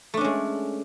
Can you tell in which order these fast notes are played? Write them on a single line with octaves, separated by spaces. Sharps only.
A3 D4 C#4 G#3